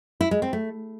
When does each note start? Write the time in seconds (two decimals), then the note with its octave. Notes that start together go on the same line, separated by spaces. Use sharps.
0.21 E4
0.31 G#3
0.42 C4
0.53 A3